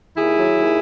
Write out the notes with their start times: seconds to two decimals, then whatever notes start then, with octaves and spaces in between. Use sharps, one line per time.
0.17 D#2 E4 G#4
0.36 F#3
0.55 D#2